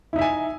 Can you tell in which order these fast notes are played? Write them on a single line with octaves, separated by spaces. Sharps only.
E4 D#4 E5 G#5